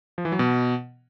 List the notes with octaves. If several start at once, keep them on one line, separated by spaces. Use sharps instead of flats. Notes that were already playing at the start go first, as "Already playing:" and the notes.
F3
E3
F#3
B2